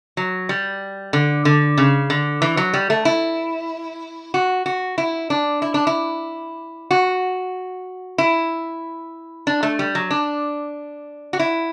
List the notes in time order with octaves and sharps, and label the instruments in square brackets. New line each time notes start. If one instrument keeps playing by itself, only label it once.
[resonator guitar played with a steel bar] F#3
G3
D3
D3
C#3
D3
E3
F#3
G3
A3
E4
F#4
F#4
E4
D4
E4
D4
E4
F#4
E4
D4
A3
G3
F#3
D4
F#4
E4